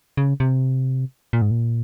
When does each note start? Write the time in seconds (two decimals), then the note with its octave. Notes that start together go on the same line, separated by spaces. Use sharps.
0.17 C#3
0.40 C3
1.33 A#2
1.42 G#2
1.51 A#2